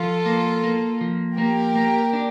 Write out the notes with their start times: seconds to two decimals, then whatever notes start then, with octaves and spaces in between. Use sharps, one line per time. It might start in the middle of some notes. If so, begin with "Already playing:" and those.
Already playing: F3 F4 A4
0.26 A#3
0.63 A#3
1.01 F3
1.37 A#3 G4 A#4
1.76 A#3
2.13 D4